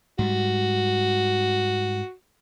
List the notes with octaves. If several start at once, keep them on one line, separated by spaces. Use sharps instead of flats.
G#2 G3 F#4